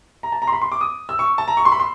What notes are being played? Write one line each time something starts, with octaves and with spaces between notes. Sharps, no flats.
A#5
A5
A#5
C6
B5
C6
D6
D#6
E6
C#6
A5
A#5
C#6
C6
B5
C6